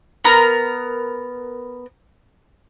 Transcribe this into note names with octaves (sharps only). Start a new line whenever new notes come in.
B3 A#4